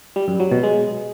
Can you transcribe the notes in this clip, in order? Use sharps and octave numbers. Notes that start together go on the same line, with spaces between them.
G3
F#2
F#3
B2
G#3